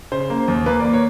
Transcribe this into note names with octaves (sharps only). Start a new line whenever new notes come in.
C#3 C5
A#3
D#2
A#3 B4
A#3 D5
C#5